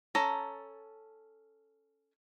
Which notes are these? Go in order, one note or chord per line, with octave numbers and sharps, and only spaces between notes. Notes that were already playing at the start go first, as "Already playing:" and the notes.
C#4 A4 A5 A#5